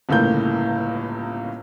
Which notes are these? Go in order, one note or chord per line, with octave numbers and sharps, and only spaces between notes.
G1 C#2 A2 A#3 G6